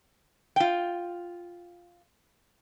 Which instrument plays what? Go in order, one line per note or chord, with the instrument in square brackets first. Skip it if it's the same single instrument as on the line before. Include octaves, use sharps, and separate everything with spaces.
[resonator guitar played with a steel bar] F4 G5